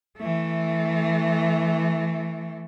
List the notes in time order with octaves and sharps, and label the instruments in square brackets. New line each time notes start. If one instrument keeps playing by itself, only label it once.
[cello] E3 A3